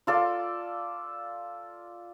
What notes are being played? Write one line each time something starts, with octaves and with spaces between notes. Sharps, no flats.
F4 A4 D5